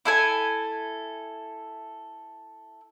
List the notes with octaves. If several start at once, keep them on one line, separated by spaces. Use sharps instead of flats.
E4 A4 G#5